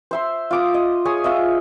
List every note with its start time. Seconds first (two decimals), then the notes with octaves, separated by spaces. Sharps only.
0.11 C5 E5 C6
0.51 F4 D6 D#6
0.74 D#5
1.05 G#4 C#5 G#5 D#6
1.24 F4 D#5 E5